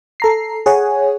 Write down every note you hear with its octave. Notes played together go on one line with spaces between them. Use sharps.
A4 A#5 C7
G#4 C#5 F#5 G#5